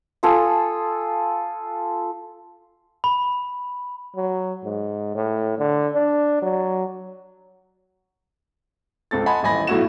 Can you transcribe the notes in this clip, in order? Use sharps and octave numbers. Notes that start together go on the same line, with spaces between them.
F4 A4 G#5 D#6
B5
F#3
G#2
A2
D3
D4
F#3
C#2 C4 A4 A6
D#5 F#5 G#5 A5 B5 C6
D#1 A1 D#5 G#5 B5 A#6
B1 A2 E4 F#4 E7